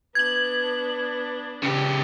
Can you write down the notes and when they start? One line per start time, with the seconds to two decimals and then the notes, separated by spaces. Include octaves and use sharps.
0.15 B3 D4 G#6 F#7
1.63 C#3 G4